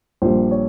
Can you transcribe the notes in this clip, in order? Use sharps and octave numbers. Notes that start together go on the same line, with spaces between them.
A#1 A#2 G3 C5
C#5